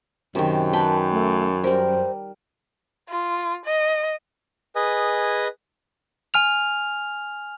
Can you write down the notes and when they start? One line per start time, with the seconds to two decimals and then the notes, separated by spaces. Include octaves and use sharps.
0.35 F#2 C3 D#3
0.73 B4 G5 A5
1.11 A3
1.64 G3 A#4 C5
3.09 F4
3.65 D#5
4.76 G#4 B4 D#5 G#5 D#6
6.34 G#5 F6 F7